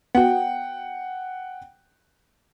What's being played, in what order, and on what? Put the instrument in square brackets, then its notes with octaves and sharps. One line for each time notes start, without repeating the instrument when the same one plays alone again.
[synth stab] B3 F#4 [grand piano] F#5 G5